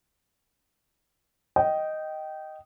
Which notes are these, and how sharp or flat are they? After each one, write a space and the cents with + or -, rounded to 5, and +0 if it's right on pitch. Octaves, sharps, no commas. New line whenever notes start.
D#5 +0 G5 -15